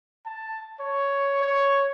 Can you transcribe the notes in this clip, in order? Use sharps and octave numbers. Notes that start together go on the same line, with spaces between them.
A5
C#5
C#5